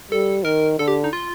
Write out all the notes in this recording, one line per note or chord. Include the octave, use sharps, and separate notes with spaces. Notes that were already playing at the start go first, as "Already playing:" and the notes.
G3 A4
D#3 A#4
D3 A4
G4
D#4
F4